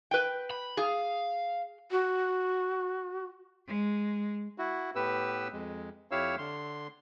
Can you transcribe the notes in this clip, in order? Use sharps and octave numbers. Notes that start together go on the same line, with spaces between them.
B4 G5
B5
G#4 F5
F#4
G#3
E4 F#4
A2 B3 G4 B4 E6
F2 G#3
F2 E4 G4 C#5 F5 E6
D3 C6